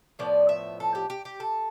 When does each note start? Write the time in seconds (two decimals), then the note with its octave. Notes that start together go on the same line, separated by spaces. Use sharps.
0.19 A2 F3 B3 D5
0.49 E5
0.80 A4
0.95 G4
1.10 G4
1.25 G4
1.40 A4